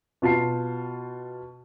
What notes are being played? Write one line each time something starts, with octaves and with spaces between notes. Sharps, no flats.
B2 F4 A5 C7